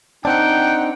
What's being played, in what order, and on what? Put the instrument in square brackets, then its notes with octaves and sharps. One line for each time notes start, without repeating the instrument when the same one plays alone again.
[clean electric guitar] C4 D4 [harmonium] D#4 [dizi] F#5 [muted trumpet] G5